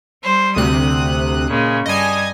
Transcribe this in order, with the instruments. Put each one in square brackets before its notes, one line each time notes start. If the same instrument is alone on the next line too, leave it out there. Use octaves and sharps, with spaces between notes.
[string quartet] G3 C5
[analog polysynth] D2 C3 F#6 [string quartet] D#6
[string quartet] A#2 C#3 G#3
[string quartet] G2 G3 [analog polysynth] D#5 G#5